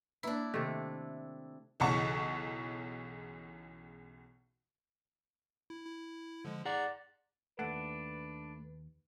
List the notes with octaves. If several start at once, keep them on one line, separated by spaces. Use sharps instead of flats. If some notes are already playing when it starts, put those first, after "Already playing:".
A#3 D4 E4 B4
C3 D#3 A3
B1 E2 C#3 F#5 A5 C#6
E4
E4
D3 F3 G#3
G#4 D5 F#5 A#5
D#2 E3 A3 D4 B4 F#5